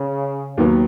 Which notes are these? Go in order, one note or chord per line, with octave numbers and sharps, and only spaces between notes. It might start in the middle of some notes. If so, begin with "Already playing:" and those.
Already playing: C#3
D#2 D#3 F#3 B3